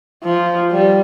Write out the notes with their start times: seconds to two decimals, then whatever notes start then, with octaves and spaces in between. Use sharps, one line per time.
0.24 F3
0.72 G3